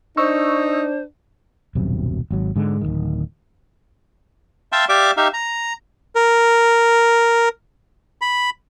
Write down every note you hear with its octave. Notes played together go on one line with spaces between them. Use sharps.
D4 D#4 C5 C#6 E6
D#1 B1 F#2 C3
G#1 F#3
G#2 D3 G#3
D1 A#1 D#3
E5 F5 G5 A5 C6
G4 D5 E5 F5 D6
D#4 G4 E5 F5
A#5
A#4
B5